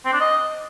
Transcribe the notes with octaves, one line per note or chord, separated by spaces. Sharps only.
C4
D4
D#5